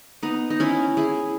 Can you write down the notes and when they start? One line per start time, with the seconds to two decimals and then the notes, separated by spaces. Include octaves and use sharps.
0.23 B3 D#4
0.50 D#4
0.60 C#4 E4
0.97 E4 G#4